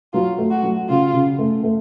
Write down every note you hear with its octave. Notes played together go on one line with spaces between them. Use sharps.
F#3 F4
A3
F#4
F#3
C#3 F4
C#3
A3
A3